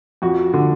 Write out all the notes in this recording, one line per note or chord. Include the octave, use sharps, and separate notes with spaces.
F2 F#4
D3